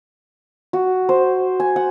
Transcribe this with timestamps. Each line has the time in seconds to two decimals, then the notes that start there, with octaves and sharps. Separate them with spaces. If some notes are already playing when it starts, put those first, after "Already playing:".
0.73 F#4
1.09 C5
1.60 G#5
1.76 F#5